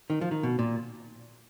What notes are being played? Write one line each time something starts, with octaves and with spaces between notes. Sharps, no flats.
D#3
F3
D#3
B2
A#2